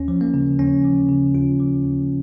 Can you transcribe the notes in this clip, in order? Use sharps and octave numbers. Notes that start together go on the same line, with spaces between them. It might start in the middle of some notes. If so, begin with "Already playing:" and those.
Already playing: D#2 C#4
F3
A#3
C#3
D#2 C#4
F3
C#3
D#2 F4
F3
D#2